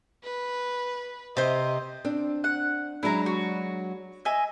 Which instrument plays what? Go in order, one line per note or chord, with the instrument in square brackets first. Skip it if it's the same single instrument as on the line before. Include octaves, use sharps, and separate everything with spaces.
[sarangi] B4
[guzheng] C3 C5 [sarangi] D#5
[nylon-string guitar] C4 D4
[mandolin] F#5
[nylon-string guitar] F#3 G#3 D4 [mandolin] E4 A#5
[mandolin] F#4
D#5 E5 G#5